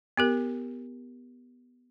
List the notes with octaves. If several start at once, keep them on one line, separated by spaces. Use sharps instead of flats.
B3 G4 A#4